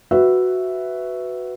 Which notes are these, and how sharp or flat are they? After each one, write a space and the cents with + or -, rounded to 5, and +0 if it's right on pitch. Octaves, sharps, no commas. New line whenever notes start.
F#4 +0 B4 +5 E5 +0